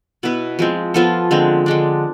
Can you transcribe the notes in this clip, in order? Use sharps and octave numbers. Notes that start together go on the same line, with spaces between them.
B2 B3 E4 B4
F3 G#3 C4
F3 B3 F4 A4
D3 G#3 C4
D3 G#3 D4